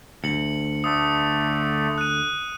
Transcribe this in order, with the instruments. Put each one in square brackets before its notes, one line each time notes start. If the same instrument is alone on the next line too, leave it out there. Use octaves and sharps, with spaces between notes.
[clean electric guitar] D2 [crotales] C#7 F#7
[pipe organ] D3 A3 [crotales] D#6
[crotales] F#6 D#7